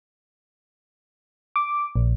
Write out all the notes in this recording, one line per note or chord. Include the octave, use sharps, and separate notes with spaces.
D6
A#1